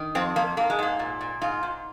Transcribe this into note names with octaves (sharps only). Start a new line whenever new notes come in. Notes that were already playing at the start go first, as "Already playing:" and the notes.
Already playing: D#3
F2 C4
F2 A#3
G#2 A#3
G#3
G#2 A#3
A#2
A#2
G#2 F4
G#2